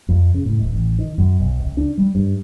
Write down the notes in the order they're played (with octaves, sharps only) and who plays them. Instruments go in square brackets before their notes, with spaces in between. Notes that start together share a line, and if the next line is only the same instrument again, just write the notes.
[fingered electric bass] F2
C#3
A2
D#1
A1
D#3
F#2
B1
C#2
D4
G3
G2